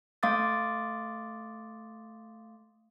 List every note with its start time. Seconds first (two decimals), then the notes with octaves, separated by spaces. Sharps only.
0.23 A3 F5 C6 D6 D#6 A6